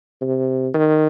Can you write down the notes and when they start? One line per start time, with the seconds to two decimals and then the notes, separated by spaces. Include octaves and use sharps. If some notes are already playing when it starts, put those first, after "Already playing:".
0.21 C3
0.74 D#3